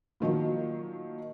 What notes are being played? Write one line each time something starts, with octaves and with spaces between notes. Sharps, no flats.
A#2 D#3 F3 F#3